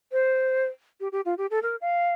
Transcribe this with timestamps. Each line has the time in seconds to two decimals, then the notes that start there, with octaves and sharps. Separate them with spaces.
0.12 C5
1.00 G4
1.12 G4
1.25 F4
1.38 G4
1.51 A4
1.62 A#4
1.81 F5